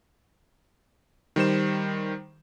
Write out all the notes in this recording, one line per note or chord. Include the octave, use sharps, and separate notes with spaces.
D#3 G3 C5 E7